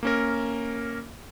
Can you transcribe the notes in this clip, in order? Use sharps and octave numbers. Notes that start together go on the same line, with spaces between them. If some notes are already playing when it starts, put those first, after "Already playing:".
A#3 C#4 A#4